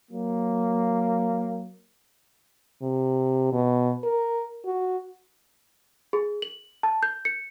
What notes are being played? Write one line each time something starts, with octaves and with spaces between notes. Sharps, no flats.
F#3 A#3
C3
B2
A#4
F#4
G#4
F#7
A5
G6
C#7